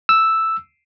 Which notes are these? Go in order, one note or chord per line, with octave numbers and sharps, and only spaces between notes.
E6